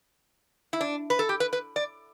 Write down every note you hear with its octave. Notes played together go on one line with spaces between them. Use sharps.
E4
D4
B4
A4
G4
B4
B4
D5